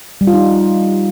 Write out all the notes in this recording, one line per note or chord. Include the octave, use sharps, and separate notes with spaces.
G3
F4
D#4